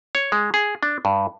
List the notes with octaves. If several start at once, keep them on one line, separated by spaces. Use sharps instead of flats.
C#5
G#3
G#4
D4
G2